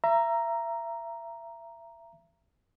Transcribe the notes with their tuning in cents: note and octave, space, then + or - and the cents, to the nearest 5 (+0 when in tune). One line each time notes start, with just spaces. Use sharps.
E5 +30 A#5 +0